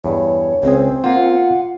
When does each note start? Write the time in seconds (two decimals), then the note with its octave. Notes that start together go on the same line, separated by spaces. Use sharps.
0.04 E2 G2 C#5
0.63 C#2 C4 G#4
1.04 A#3 F4 C5 F#5